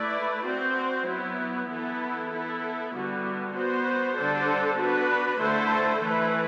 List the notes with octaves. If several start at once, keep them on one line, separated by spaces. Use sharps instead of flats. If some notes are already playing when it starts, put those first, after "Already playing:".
Already playing: A3 E4 B4 D5
C4 F#4 C5
F#3 B3 E4
E3 B3 E4 A4
B3 E4 A4
D3 G3 B3 F#4
B3 F#4 C5
D3 G3 D4 A4 C5
B3 D4 F#4 B4
D3 A3 E4 A4 C5
E3 A3 E4 B4